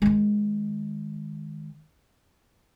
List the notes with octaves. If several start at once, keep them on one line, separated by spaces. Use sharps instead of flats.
D#3 G#3